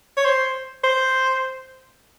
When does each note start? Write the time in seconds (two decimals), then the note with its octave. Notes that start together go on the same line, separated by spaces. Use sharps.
0.17 C#5
0.25 C5
0.84 C5